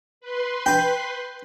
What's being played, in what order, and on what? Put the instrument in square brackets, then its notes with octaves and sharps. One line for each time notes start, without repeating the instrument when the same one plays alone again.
[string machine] B4 C6
[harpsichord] G5 B5